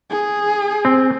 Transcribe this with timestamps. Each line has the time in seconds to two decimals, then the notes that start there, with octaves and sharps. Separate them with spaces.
0.10 G#4
0.85 C4